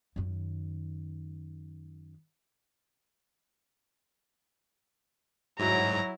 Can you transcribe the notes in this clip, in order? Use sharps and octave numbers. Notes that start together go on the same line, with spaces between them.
F#2 D#3
G#2 F#3 E4 A#5